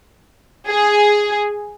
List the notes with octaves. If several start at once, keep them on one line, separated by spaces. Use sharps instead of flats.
G#4